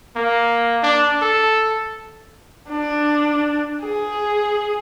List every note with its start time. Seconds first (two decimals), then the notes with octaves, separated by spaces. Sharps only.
0.16 A#3
0.83 D4
1.22 A4
2.70 D4
3.82 G#4